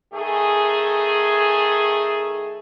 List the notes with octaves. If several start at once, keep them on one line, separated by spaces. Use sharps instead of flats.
D#3 A3 G#4